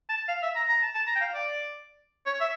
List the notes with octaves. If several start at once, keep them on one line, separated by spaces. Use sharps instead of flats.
A5
F5
E5
A#5
A#5
A5
A5
A#5
G5
F5
D5
C#5
E5